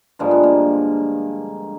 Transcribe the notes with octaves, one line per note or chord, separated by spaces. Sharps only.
G2 D3 F3 G#3 A#3
B3
A#3